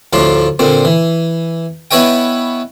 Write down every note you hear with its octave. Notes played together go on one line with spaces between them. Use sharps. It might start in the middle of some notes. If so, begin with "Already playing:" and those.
D2 A2 F3 D4 C6
A#2 D3 C4
E3
B3 E4 B4 C#5 D#5 G5